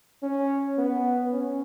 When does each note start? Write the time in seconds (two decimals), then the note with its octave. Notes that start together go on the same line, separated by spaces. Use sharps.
0.23 C#4
0.79 B3
1.33 C#4